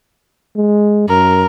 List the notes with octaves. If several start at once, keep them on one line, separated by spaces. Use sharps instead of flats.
G#3
F#2 A#4